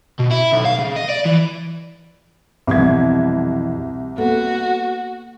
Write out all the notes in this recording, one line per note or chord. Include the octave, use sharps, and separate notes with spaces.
B2
E4
B1
F5
C#3
D#5
D5
E3
C2 F2 B2 E3 G#6
A#3 B3 F#4 A4